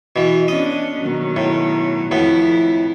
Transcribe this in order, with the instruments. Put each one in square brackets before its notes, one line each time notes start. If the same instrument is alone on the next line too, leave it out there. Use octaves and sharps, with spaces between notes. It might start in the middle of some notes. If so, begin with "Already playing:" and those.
[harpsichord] B2 E3
[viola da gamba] B3 C#4 D4 [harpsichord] D#5
[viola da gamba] B2 D#3 F#3
[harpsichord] A2
[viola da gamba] F2 E4 [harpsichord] A2 B3